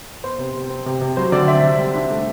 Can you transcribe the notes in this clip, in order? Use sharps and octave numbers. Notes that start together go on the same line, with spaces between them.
B3 C5
C3
C3
C4
C3
C3
F#3 C5
D3 D5
C4 E5
C3
G3
D4
A3